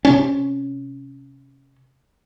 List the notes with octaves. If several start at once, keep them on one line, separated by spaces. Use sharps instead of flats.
C3 C#4